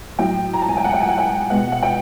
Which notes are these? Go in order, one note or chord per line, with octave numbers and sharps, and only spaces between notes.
A2 F#3 G5
A#5
A5
G#5
G5
F#5
G5
G#5
F#5
G5
B2 G#3 F#5
F#5
G5